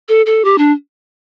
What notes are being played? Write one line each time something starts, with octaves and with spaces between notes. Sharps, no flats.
A4
A4
G4
D4